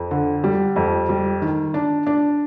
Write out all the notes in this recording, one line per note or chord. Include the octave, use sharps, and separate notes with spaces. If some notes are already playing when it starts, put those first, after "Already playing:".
Already playing: F2
D3
G3
F2
G3
D#3
D4
D4